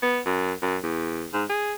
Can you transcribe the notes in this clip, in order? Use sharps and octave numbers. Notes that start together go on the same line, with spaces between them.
B3
F#2
F#2
E2
G#2
G#4